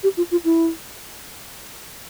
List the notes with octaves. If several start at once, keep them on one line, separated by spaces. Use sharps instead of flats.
G4
F4
F4
E4